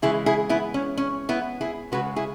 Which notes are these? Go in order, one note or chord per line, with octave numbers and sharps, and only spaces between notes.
C#3 E3 G#3 E4 G#4
E4 G#4
B3 E4
C#4
C#4
B3 E4
E4 G#4
C#3 G#3 F#4 B4
E4 G#4